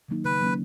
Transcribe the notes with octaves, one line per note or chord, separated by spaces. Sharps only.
D#3 F#3 A#3 D#4
C#3 B4
F#3 A#3 C#4